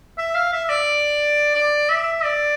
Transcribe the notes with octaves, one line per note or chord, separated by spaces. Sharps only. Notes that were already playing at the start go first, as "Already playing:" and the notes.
E5
F5
E5
D5
D5
E5
D5